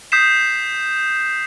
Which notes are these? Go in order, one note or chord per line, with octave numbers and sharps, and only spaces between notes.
D#6 G6 B6 C7 E7